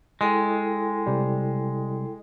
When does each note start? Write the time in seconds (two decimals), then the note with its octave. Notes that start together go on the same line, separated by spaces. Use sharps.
0.21 G#3 E4 A4 G5
1.06 C3 G3